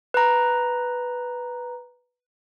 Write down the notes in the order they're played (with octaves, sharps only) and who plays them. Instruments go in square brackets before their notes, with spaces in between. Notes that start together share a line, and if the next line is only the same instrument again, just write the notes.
[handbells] B4 A#5